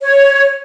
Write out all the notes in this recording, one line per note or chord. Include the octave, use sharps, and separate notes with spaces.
C#5